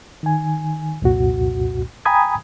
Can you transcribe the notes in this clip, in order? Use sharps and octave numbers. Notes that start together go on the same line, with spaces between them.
D#3 G#5
C2 F2 A#2 F#4
G5 G#5 A#5 B5 D#6 G#6